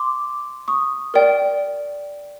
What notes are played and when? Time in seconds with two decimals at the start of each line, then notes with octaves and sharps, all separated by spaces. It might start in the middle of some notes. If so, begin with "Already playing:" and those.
Already playing: C6 D6
0.68 C#6 D#6
1.14 A#4 D5 G5